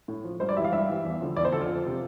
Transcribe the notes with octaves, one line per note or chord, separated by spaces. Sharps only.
A2
F3
G2 C5
D5
E3 G3 E5 F5
G2 E5
E3 G3
E2
D3 F3
E2 D5
C5
D3 F3 A4
F4
F2
C3 F3